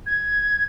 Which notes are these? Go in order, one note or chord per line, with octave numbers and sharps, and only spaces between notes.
G#6